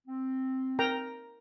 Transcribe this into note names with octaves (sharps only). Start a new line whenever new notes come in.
C4
A#4 G5 A#5